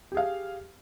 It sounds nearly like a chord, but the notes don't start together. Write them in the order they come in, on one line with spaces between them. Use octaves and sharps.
G4 G#4 F5